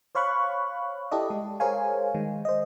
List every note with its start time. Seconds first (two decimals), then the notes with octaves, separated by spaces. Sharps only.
0.15 C5 C#5 F5 B5 C#6 F#6
1.11 E4 G4 A4 D5 D#5
1.30 G#3
1.60 G#4 A#4 C5 C#5 F5 G#5
2.14 D#3 G#3
2.45 C5 D#5